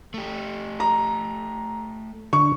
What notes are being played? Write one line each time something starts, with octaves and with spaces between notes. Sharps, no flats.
A3 G4
A#5
D3 C#6